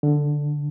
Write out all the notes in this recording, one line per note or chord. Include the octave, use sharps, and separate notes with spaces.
D3